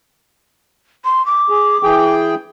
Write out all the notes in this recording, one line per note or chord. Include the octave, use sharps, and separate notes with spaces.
C6
D6
G#4
E3 G#4 G5